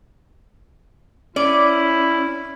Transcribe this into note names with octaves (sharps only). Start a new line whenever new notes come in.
C#4 E4 D5